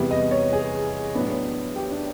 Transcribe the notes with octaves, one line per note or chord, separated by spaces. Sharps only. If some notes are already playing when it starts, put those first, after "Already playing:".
Already playing: E2 C3 E3 G3 B3
D#5
C#5
G#4
A2 F#3 B3 D4
G4
D4